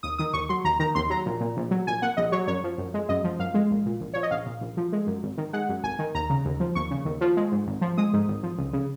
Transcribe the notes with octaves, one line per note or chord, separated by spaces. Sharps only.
D#2 D#6
D#3 D#6
D#2 C#6
F#3 C6
D#2 A#5
D#3 A#5
D#2 C6
F#3 A#5
A#1
A#2
A#1
F#3
A#1 G#5
A#2 F#5
A#1 D#5
F#3 C#5
F#2 C#5
F3
F#2
G#3
F#2 D#5
F3
F#2 F5
G#3
A#1
A#2
A#1
F3 C#5
D#5
A#1 F5
A#2
A#1
F3
G#3
F#2
G#1
D#3
G#3 F#5
F#2
G#1 G#5
D#3
D#2 A#5
C#3
D#2
F3
D#2 C#6
C#3
D#2
F3
G#3
G#2
G#1
F3
G#3 D#6
G#2
G#1
F3
C#2
C#3